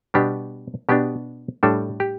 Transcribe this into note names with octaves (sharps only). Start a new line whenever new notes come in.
B2 G3 B3 D4 G4
B2 B3 D4 G4
A2 G3 D4 A4
G4